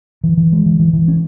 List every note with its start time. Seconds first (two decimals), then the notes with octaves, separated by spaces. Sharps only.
0.24 E3
0.37 E3
0.52 G#3
0.66 E3
0.79 E3
0.93 E3
1.08 C#4